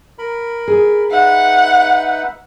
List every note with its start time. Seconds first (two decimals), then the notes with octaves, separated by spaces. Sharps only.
0.18 A#4 B5
0.68 G#4
1.11 D#4 B4 E5 F#5